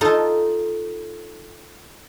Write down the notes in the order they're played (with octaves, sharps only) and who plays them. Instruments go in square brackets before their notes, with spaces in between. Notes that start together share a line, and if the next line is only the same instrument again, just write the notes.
[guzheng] D#4 F4 A4